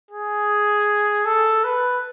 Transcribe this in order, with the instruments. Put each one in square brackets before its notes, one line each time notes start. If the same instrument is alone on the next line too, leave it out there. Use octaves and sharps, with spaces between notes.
[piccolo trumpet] G#4
A4
B4